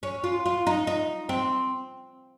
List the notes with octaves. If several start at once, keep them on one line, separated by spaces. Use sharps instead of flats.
C#4
F4
F4
D#4
D#4
C4